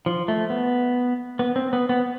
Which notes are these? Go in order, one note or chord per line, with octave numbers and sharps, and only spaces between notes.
F3
A3
B3
B3
C4
B3
B3